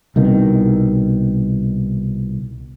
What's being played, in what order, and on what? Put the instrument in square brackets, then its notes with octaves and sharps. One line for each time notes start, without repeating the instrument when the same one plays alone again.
[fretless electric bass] C2 B2 D#3